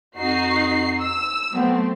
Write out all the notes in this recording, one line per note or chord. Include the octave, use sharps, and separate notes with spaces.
F2 D#4 F#4 C7
E6
F#3 A3 B3 C4